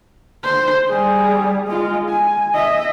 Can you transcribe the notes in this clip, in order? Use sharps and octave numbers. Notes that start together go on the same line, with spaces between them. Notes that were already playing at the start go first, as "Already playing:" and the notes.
C5
G3 G#4
G#3 F4
G#5
D#5 E5